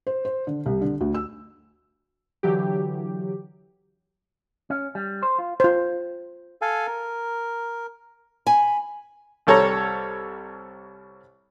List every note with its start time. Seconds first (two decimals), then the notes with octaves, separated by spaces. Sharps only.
0.07 C5
0.25 C5
0.47 D3
0.66 C2
0.82 D3
1.01 D2
1.14 E6
2.43 D3 E3 F#3 G4
4.70 C#4
4.95 G3
5.23 C5
5.39 F4
5.60 F4 C5
6.62 A4 F5 G#5
6.87 A#4
8.47 G#5 B5
9.47 C2 G3 A4 C#5 A5 A#5